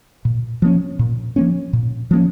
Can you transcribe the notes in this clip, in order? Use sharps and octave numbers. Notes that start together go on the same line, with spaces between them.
A#2
F3 A#3 C#4
A#2
F3 A#3 C#4
A#2
F3 A#3 C#4